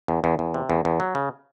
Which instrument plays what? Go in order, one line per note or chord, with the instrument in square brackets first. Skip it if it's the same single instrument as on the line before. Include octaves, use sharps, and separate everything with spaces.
[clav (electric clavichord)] E2
E2
E2
C3
E2
E2
F#3
C#3